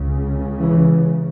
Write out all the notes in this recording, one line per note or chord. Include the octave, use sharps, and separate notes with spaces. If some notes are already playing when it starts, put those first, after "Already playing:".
Already playing: C#2 C#3
E3